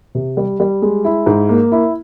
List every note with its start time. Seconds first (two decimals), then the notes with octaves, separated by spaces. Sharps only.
0.15 C3
0.37 G3
0.60 G3
0.82 G#3
1.05 E4
1.26 G#2
1.49 A#3
1.72 E4